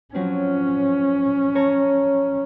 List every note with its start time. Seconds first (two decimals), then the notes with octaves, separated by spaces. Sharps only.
0.14 F3 F#3 C4 C#4
1.55 C#5 A5 A#5